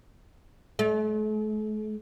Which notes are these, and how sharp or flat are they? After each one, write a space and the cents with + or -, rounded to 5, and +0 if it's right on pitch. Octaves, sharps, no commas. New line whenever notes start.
A3 -45